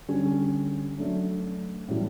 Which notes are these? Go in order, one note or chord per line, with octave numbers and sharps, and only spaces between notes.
D3 G3 C#4
F#3 A3 D4
A2 E3 G3